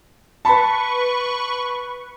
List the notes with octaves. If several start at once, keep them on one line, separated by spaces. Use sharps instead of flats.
B4 A5 B5 C#6